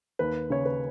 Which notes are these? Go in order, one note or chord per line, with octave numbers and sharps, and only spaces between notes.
D#2 B4
C#3 C#5
B4